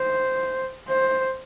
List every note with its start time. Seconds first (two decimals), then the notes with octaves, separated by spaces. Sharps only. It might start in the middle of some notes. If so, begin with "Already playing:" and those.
Already playing: C5
0.89 C5